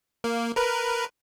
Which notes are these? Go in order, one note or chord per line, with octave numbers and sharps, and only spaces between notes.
A#3
A#4 B4